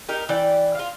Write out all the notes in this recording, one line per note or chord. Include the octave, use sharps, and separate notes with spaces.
D#4 G4 A#4
E3 D5 G5
F4 F5